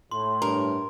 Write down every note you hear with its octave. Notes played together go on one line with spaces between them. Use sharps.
A2 C6
G2 A#4